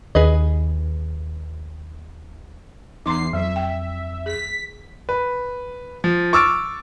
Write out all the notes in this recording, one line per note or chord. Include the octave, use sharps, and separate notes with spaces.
D#2 G#4 B4 D#5
E2 D#4 A#5 C6 D6 C7
F2 F#3 E5
G5
G#4 B6
B4
F3
C#6 D6 E6 F6 A6 D7